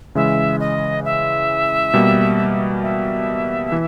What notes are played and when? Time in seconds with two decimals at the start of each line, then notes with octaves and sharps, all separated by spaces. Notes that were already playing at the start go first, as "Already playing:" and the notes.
0.15 C#3 E3 G#3 E5
0.60 D#5
1.04 E5
1.94 B2 G3 A#3
2.83 E5
3.72 E3